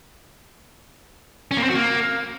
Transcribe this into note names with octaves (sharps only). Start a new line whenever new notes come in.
C#4
A#3
C4
F#4
A#3